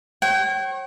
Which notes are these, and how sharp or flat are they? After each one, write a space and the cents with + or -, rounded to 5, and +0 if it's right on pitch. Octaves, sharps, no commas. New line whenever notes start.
C#5 -35 G5 -40